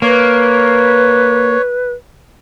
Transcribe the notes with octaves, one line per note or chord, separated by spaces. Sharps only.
A#3 B4 C#5